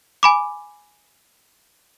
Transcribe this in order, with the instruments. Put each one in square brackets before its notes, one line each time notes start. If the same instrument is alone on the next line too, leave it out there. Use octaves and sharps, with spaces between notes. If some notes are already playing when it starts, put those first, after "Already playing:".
[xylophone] G#5 B5 D6